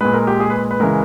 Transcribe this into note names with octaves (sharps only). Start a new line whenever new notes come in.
A#2 G#3 B4
A#4
G4
G#4
B4
B4
C#3 E3 G#3 A#4